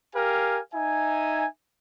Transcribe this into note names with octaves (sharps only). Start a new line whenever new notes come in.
G4 A#4 F5 G#5
D#4 E5 G#5